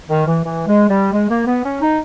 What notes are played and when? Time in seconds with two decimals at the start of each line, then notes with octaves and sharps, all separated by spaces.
0.09 D#3
0.27 E3
0.44 E3
0.67 G#3
0.89 G3
1.13 G#3
1.29 A#3
1.47 B3
1.65 C#4
1.81 D#4